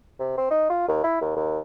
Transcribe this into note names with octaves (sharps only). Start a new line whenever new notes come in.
C3
C4
D#4
F4
D#2
E4
D#2
D#2